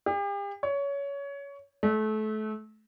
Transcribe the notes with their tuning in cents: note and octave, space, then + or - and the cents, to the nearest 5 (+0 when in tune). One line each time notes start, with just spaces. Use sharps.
G4 +40
C#5 +20
A3 -30